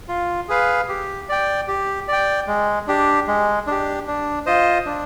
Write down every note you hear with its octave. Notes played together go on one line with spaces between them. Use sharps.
F4
G#4 B4 F5
G4
D5 G5
G4
D5 G5
G#3
D4 G4
G#3
D4 G4
D4
F4 C5 D#5
D4